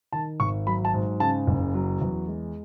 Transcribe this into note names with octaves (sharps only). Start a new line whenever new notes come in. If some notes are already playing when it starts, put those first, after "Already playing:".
D#3 A5
G#1 C#6
F#3 B5
A5
G#2
C#3 A5
F#1
F#3
E2
G#3